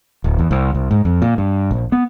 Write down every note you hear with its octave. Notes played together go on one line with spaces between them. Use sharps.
D1
E2
C2
C2
G#2
F2
A#2
G2
A#1
B3